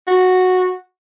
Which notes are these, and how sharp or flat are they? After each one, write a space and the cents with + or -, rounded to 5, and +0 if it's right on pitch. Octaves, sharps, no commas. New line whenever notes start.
F#4 -10